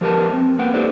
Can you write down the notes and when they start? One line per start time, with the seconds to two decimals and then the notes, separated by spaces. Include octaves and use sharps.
0.01 F3 G4 A#4 B4 A5
0.33 C4
0.59 A#3 B4 F#5 G5
0.74 D#4 G4 A4 B4 C5 D5